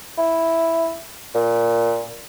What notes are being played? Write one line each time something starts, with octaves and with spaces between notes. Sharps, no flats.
E4
A#2